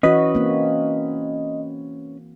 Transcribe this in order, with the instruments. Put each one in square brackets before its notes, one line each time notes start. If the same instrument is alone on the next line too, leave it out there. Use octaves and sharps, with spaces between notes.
[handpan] E3 F#4 [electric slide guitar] C#4 B4 [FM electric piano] D#5
[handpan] A#3 C4